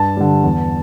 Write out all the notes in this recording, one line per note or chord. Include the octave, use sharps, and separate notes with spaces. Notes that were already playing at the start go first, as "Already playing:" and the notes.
Already playing: G2 A5
D3 G3
E2